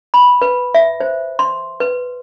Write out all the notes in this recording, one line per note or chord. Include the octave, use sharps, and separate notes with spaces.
B5
B4
E5
C5
C6
B4